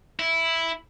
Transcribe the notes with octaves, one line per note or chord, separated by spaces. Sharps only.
E4